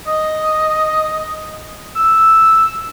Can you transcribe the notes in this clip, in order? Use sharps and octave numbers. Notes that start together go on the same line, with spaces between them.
D#5
E6